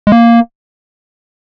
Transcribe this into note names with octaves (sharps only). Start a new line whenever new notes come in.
G#3
A#3